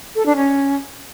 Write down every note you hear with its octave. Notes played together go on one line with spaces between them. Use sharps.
A4
D4
C#4